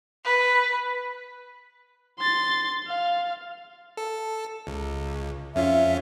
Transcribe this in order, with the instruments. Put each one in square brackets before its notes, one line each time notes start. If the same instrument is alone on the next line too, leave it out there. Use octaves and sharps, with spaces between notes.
[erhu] B4
[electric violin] C6 A6
F5
[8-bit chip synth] A4
C#2
[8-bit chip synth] F2 C#4 F4 [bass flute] E5